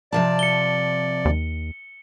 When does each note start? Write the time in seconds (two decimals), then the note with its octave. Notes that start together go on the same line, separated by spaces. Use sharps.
0.12 C3 F3 D5 A5
0.39 C#7 G7
1.25 D#2